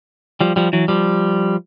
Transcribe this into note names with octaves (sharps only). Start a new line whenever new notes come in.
F3 G3
F3 G3
E3 F#3
F3 G3